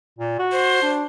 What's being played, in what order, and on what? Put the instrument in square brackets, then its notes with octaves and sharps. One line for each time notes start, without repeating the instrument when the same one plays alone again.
[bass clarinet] A#2
F#4
[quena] C5
[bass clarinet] D4